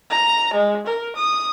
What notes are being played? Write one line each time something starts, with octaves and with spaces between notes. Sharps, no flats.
A#5
G#3
A#4
D#6